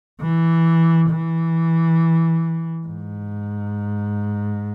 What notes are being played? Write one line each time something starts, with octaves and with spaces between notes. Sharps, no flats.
E3
E3
G#2